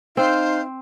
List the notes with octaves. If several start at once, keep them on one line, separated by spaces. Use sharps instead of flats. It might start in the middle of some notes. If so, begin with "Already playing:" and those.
C4 D#4 C5 F5